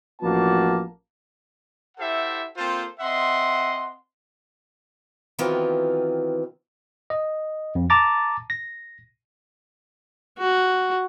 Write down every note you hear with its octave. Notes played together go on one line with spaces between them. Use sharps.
A1 F3 A#3 D4 F#4 A5
E4 G4 A4 C5 E5 F#5
A#3 C4 F4 A4 C5
C4 D#5 E5 F#5 C6
D#3 E3 F#3 B3 C4 F4
D#5
F2
A5 A#5 D6 A6
A#6
F#4